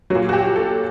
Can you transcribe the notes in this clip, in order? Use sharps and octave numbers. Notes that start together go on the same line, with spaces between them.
A#2 F#3 F#4
F#4
G4
A4